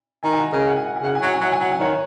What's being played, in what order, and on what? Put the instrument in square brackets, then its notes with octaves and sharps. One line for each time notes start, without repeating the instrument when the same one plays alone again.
[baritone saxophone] D#3 [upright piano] D#5 G#5
[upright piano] G#5
F#5 A#5
[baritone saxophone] C#3 [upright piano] A#4 D#5
[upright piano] F#5
G#5
F#5
G#5
[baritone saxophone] C#3 [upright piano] F#5
[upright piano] G#5
[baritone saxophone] F#3 [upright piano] F#5
[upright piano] G#5
[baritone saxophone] F#3 [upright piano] F#5
[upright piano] G#5
[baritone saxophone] F#3 [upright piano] F#5
[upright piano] G#5
[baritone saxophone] D#3 [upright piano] C#5 F#5